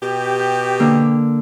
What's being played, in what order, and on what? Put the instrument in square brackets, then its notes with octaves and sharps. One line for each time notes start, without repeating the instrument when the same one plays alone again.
[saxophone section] B2 G4
[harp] G6
D3 A#3